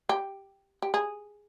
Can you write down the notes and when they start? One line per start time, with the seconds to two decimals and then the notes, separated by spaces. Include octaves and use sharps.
0.09 G4
0.82 G4
0.94 G#4